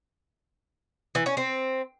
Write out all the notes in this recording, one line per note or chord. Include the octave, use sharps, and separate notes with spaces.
E3
C#4
C4